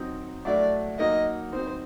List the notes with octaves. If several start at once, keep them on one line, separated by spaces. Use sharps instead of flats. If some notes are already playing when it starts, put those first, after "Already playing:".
Already playing: F#3 C4 D#4
A2 F#3 A3 D4 F#4 D5
F#3 A#3 D#4 F#4 D#5
F#3 C4 D#4 C5